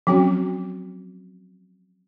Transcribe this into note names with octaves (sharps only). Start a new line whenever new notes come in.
F3 F#3 C4 C#4 F#4